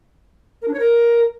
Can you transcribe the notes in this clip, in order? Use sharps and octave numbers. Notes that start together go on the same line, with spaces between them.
A#4
D4
C#5
A#4